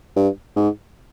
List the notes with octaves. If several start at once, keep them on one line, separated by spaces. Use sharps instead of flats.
G2
G#2